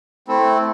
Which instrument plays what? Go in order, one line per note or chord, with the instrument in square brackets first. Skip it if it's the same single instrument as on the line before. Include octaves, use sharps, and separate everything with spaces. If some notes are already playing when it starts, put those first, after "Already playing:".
[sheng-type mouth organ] A3 C4 E4 A4